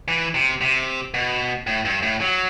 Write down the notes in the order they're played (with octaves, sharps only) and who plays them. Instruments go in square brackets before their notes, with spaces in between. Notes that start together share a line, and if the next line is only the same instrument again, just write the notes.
[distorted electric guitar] E3
C3
C3
B2
A2
G2
A2
F#3